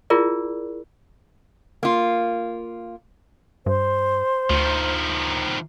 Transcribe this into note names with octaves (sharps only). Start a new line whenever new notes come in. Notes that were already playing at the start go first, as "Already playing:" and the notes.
E4 F4 G#4 A#4 D5
A#3 F4
G2 C5
D2 D#3 F3